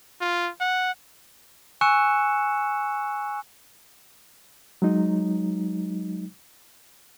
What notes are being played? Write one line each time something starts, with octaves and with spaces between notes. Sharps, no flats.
F4
F#5
G#5 C#6 E6 F#6 C#7 E7
F#3 G#3 D#4